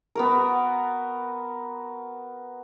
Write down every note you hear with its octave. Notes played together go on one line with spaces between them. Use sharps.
B3 F#4 A#4